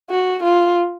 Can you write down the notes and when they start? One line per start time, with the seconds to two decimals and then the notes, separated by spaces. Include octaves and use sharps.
0.10 F#4
0.43 F4